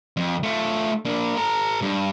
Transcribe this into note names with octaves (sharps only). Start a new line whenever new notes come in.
F2
A3 F4
A#3 D4
A4 A#5
G2